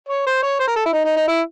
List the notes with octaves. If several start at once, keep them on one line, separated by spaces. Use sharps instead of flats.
C#5
C5
C#5
C5
A#4
A4
E4
D#4
D#4
D#4
E4